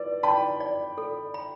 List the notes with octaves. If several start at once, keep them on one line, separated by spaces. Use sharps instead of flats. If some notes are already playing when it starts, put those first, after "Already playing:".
Already playing: B4 D5
G5 A5 B5
D5
A4
B5